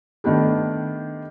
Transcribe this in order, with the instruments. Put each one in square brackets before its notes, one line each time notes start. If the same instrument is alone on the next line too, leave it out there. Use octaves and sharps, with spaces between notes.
[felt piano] D#3 A3 B3 D4 G4